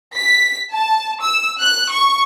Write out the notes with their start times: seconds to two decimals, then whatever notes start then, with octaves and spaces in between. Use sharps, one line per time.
0.16 B6
0.73 A5
1.22 E6
1.60 F#6
1.91 C#6